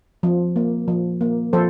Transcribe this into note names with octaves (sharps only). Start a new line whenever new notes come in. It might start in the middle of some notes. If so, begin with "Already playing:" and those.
F3
A#3
F3
A#3
F3 A4 C5